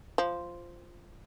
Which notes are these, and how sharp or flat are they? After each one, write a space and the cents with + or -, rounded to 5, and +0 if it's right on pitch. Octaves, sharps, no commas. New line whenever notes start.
F3 -5